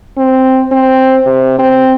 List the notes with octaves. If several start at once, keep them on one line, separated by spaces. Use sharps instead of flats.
C4
C4
C3
C4